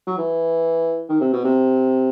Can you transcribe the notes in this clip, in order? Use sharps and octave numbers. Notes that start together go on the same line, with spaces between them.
F#3
E3
D#3
C3
B2
C3